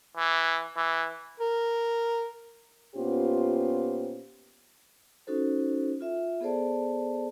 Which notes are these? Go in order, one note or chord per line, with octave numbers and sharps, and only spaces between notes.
E3
E3
A#4
A#2 B3 C#4 F4 G4 C5
C#4 D#4 F#4 A4 C5
F4 E5
B3 G#4 A4 C5 D5 A5